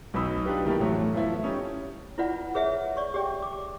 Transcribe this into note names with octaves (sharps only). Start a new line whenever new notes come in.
B1 B2 D#4 B5 E6
D4 D#4 F4 G4 B4
D#3 E3 G3 A3 A#3
A1 A2 F3 F#3 A3
E3 F3 A3 B3 E4 F4
G3 C#4 D#4
E4 F4 B4 D5 F#5 B5
G#4 B4 C#5 E5 F#5 A5
D5 C#6
G4 G#4 D5 G5
D6